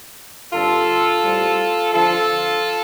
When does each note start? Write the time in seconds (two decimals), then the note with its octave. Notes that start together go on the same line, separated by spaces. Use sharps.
0.53 G2 D3 G3 C4 F4 A4
1.23 A2 G3 C4
1.93 D3 F3 C4 F4 A4